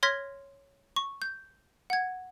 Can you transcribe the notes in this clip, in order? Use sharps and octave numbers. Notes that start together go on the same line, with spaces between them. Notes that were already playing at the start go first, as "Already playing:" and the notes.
C#5 C6 F6 G#6 A#6 B6
C#6
G6
F#5 G#6